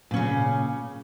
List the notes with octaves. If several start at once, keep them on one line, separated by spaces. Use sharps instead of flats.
A#2 C#3 C#4